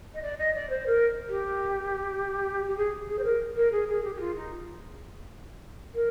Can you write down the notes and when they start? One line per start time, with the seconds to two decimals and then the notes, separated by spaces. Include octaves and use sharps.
0.14 D#5
0.22 D5
0.38 D#5
0.54 D5
0.69 C5
0.86 A#4
1.28 G4
2.68 G4
2.77 G#4
3.08 G#4
3.19 C5
3.24 A#4
3.56 A#4
3.72 G#4
3.88 G#4
4.04 G4
4.15 G4
4.20 F4
4.35 D#4
5.94 A#4